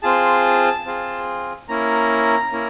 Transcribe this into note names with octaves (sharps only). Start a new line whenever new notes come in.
C4 F4 G#4 A5
C4 F4 G#4
A#3 C#4 E4 A#5
A#3 C#4 E4